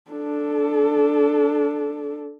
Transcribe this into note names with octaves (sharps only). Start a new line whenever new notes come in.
D4 A4